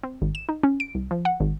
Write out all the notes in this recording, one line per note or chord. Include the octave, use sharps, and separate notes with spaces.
C4
G#1
E7
D#4
C#4
D7
C2
F3
F#5
G#1